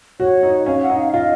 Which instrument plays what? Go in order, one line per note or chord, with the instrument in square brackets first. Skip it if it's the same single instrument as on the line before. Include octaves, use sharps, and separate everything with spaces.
[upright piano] F#4 [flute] C#5
[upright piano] D#4
[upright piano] C#4 [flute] F5
[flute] F#5
[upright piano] D#4
[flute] F5
[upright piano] F4 [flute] D#5